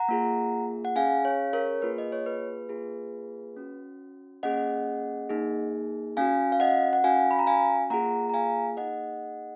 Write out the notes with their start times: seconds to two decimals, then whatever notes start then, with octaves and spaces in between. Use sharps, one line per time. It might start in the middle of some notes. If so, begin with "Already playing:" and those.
Already playing: F#5 A#5
0.08 A#3 F4 G#4
0.85 F#5
0.96 C#4 G#4 F5 G#5
1.25 C#5 F5
1.53 A#4 C#5
1.82 A#3 F4 G#4 B4
1.98 D#5
2.12 C#5
2.26 B4
2.69 A#3 F4 G#4
3.56 C#4 F#4
4.43 A#3 C#4 G#4 D#5 F#5
5.29 A#3 D#4 G#4
6.17 C#4 F#4 F5 G#5
6.52 F5
6.60 D#5 F#5
6.93 F#5
7.04 C#4 F#4 F5 G#5
7.31 B5
7.39 A#5
7.47 F5 G#5
7.90 A#3 F4 G#4 F#5 A#5
8.29 A#5
8.34 F5 G#5
8.77 A#3 D#4 G#4 D#5 F#5